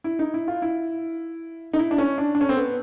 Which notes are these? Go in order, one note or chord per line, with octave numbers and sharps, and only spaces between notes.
E4
D#4
E4
F4
E4
D#4
E4
D4
C#4
D4
D4
C#4
C4
B3